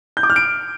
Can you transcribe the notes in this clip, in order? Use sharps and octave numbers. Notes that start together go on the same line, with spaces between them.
G6
D6
F6
D7